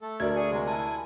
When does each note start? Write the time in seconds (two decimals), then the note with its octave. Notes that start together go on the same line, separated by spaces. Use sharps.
0.01 A3 A4
0.20 D2 A#4 D5 G#6
0.36 G#4 G#5 C#6
0.51 C3 F#3 G#3
0.68 E4 G#5 A5